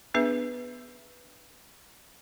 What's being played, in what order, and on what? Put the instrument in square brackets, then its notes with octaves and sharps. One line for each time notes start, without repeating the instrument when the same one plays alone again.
[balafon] B3 D4 G#4 B4 E5